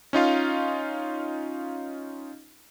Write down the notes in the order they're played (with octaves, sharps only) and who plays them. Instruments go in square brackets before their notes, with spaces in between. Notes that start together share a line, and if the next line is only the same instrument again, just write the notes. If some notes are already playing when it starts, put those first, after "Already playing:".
[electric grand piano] C#4 D#4 F4 F5